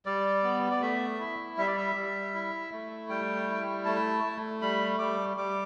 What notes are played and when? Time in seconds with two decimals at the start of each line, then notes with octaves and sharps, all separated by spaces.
0.06 G3 D5
0.43 B3
0.71 D5
0.81 A3 E5
1.20 E4
1.58 G3 E5
1.67 D5
1.77 E5
1.95 G3
2.34 E4
2.72 A3
3.09 G3 G5
3.48 E4
3.85 A3 A5
4.24 A3
4.61 G3 B5
4.99 G3 D6
5.37 G3 D6